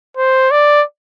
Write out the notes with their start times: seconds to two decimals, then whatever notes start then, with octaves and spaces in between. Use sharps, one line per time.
0.17 C5
0.51 D5